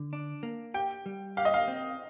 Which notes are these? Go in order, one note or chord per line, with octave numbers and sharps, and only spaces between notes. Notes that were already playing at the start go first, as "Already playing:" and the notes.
Already playing: D3
D4
A#3
G4 G5
G3
G4 F5
D#5
F5
C4